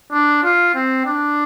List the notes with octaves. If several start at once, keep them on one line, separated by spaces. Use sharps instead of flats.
D4
F4
C4
D4